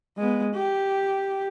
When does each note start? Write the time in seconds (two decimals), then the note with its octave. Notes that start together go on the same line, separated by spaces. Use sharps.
0.18 G#3 B3
0.54 G4